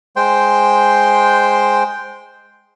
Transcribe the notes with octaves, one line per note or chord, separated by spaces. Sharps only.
G#3 C5 G5 C6